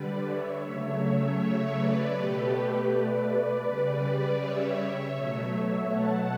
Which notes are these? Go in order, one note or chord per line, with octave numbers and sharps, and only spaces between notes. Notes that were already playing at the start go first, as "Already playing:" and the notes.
Already playing: D3 G3 B4 D5
C#5 E5
C#3 F#3 A3
C#5 E5
B4 D5
B2 A3 G4 B4
G4 B4
B4 D5
C#3 G3
C#5 E5
B2 F#3 A3
F#5 A5